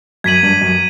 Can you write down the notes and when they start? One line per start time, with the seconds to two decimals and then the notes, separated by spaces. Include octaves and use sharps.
0.24 F#2 G#6 B6 D#7 F#7
0.43 G2
0.61 F#2